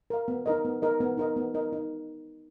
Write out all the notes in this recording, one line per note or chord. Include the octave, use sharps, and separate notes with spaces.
A#4 F5
B3
D#4 A#4 D#5
B3
D#4 A#4 D#5
B3
D#4 A#4 D#5
B3
D#4 A#4 D#5
D#4